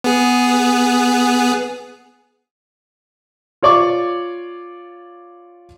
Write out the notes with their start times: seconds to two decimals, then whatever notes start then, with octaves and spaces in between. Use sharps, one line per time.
0.04 B3 G#4
3.63 F4 C#5 D5 C#6 D6